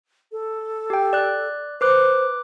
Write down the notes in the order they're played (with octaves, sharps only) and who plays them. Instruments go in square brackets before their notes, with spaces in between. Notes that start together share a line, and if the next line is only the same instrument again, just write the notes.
[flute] A4
[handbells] G4 G5
D5 F#6
[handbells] B4 D6 F#6 [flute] C5